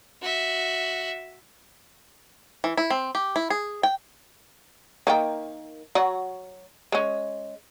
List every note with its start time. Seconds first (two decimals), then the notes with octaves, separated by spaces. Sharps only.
0.22 F#4 E5
2.64 E3
2.77 E4
2.90 C4
3.15 G4
3.36 E4
3.50 G#4
3.83 G5
5.07 D#3 A#3 G5
5.95 F#3 F#4
6.92 G#3 C#4